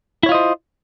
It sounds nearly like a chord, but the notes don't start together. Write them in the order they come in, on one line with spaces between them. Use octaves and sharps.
E4 C#5 F4 D#5 C5